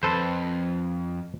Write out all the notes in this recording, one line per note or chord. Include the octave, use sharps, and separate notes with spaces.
F2 A4 B4 C5